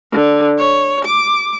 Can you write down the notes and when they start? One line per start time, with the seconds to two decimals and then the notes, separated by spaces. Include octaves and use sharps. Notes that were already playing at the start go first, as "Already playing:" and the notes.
0.12 D3
0.58 C#5
1.05 D6